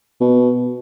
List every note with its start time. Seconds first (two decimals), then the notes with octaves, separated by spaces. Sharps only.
0.20 B2